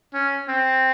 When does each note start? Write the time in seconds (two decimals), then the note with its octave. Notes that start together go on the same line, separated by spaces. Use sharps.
0.14 C#4
0.48 C4